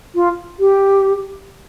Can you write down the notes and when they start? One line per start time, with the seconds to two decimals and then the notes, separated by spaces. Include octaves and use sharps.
0.15 F4
0.59 G4